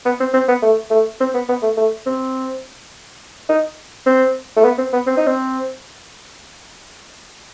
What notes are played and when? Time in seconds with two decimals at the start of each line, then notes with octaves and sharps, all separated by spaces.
0.05 B3
0.20 C4
0.34 C4
0.48 B3
0.62 A3
0.90 A3
1.20 C4
1.34 B3
1.49 B3
1.62 A3
1.77 A3
2.06 C4
3.49 D#4
4.06 C4
4.56 A3
4.64 B3
4.78 C4
4.93 B3
5.06 C4
5.17 D#4
5.27 C4